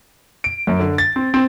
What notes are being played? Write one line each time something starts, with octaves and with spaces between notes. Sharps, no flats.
D7
F#2
D3
A6
C4
C4